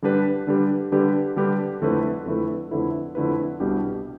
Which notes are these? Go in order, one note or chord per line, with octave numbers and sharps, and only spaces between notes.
D3 G3 D4 G4 B4
D3 G3 D4 G4 B4
D3 G3 D4 G4 B4
D3 G3 D4 G4 B4
F2 D3 A3 E4 B4
F2 D3 A3 E4 B4
F2 D3 A3 E4 B4
F2 D3 A3 E4 B4
C2 B2 G3 D4 G4